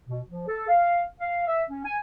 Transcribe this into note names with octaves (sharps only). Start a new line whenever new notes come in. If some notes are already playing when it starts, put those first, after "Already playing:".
B2
F3
A4
F5
F5
E5
C#4
G#5